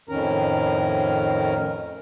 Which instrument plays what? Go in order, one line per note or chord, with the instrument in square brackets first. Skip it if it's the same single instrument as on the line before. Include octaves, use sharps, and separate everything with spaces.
[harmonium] F2 A2 D#3 C#4 A#4 A#5